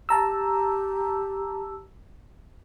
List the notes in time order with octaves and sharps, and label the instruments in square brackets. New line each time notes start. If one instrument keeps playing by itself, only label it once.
[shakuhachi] G4 [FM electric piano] A5 A#5 E6